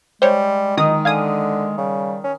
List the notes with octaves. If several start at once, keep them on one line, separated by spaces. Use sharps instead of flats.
G3 G#3 C5 C#5
D#3 D#4 D#5 D#6
D3 F5 G#5 D#6
C#3 G3
C#4